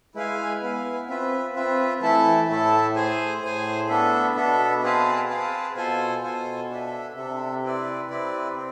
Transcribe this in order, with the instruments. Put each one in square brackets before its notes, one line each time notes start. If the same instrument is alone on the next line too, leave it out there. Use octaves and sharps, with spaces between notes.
[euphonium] G#3 [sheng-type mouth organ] E4 B4 F5 G#5
[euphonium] B3 [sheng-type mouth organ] E4 B4 F5 G#5
[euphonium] C4 [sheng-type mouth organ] F4 B4 E5
[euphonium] C4 [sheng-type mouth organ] F4 B4 E5
[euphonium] E3 [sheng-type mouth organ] A3 E4 A4 E5 A5
[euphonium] A2 [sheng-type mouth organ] A3 E4 A4 E5 A5
[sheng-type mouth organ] G#4 C5 G#5
[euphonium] A2 [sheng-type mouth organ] G#4 C5 G#5
[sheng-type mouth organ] B3 D4 A4 E5
[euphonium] B2 [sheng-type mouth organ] B3 D4 A4 E5
[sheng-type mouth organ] C4 G#4 B4 F5 A5
C4 G#4 B4 F5 A5
[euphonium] B2 [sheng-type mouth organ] F4 A4 C5 G#5
[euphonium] B2 [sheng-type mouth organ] F4 A4 C5 G#5
[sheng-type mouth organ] D4 A4 E5
[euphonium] C3 [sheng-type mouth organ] D4 A4 E5
[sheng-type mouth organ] C4 E4 B4 D5
[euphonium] C3 [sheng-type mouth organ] C4 E4 B4 D5
[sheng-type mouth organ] C4